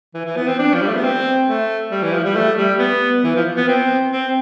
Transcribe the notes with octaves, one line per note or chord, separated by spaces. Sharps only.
E3
E3
B3
C4
D4
F3
G3
A3
B3
C4
A3
G3
E3
F3
G3
A3
G3
B3
E3
F3
B3
C4
C4